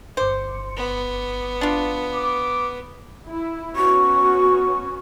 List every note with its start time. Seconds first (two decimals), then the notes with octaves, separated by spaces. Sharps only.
0.17 G1 C5 D6 C#7
0.77 B3
1.61 D4 F4
2.13 D6
3.28 E4
3.76 B3 C#4 F#4 C#6